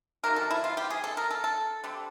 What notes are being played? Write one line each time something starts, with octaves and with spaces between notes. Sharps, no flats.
C3 D#3 F#3 A#3 A#4
A4
E4
F4
G4
G#4
A4
A#4
A4
A4
D3 G3 C4